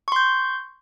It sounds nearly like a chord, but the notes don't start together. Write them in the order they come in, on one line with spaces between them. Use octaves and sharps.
C#6 C6 G6